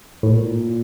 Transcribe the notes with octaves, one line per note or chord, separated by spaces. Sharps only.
A2
A#2